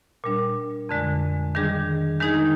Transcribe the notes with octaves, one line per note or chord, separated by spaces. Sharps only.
A#2 G3 D4
F2 D3 G#3
D#3 G3 D4 G#4
D#3 G#3 D#4 G#4